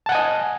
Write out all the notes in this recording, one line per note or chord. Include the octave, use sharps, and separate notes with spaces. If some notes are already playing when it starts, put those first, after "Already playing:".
D#5 F#5 G#5 A5